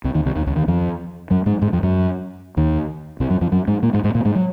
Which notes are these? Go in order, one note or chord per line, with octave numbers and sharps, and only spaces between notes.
C2 C3
D#2 D#3
C2 C3
D#2 D#3
C#2 C#3
D#2 D#3
F2 F3
F#2 F#3
G#2 G#3
G#2 G#3
F2 F3
F#2 F#3
D#2 D#3
C2 C3
F#2 F#3
F2 F3
F#2 F#3
G#2 G#3
A#2 A#3
G#2 G#3
G#2 G#3
A#2 A#3
G#2 G#3
F#3